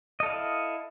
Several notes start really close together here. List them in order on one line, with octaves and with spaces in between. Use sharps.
D#5 A4 F5 E4